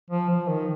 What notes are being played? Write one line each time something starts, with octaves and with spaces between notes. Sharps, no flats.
F3
F3
D#3